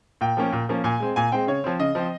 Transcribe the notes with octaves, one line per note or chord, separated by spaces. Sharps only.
A#2 G5
F3 A#3 C#4
A#2
F3 A#3 C#4
A#2 G#5
G#3 C4
A#2 G#5
G#3 C4 G5
C#3 C#5
F3 C4
C#3 D#5
F3 C4